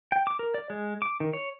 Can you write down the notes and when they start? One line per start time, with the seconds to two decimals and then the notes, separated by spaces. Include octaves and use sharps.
0.12 G5
0.27 D6
0.39 A#4
0.54 D5
0.70 G#3
1.02 D6
1.20 D#3
1.33 C#5